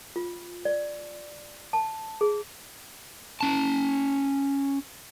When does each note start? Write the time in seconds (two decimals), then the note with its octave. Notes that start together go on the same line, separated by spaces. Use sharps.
0.16 F4
0.65 D5
1.73 A5
2.21 G#4
3.41 C#4 A5